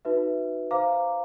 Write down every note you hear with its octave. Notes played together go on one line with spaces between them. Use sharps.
D#4 F#4 B4 E5
C5 F5 A#5 D6